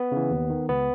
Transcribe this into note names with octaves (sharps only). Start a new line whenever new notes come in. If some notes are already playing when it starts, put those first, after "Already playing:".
Already playing: B3
C#3 E3
D#2
D#3
C#2 B3